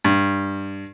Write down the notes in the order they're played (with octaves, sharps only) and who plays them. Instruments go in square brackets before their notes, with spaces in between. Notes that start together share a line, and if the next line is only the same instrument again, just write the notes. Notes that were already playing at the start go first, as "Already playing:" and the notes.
[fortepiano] G2